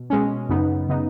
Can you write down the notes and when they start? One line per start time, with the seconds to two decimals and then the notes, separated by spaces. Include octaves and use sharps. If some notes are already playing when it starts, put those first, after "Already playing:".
Already playing: B2
0.10 B2 G#3 C#4
0.49 F#2 C#3 B3 D#4
0.89 C#3 B3 D#4